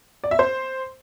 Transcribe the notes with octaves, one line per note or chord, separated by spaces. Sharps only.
D5
E5
C5